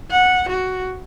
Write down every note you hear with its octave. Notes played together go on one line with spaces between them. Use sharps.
F#5
F#4